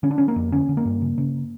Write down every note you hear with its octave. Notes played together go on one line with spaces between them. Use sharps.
D3 C#4
D4
D3 C#4
A#3
F2
D3 C#4
D3
A#3
G2
C#3
C#3